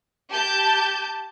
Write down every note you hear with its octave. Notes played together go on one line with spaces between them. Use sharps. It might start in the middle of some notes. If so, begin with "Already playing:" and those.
G4 A5 G6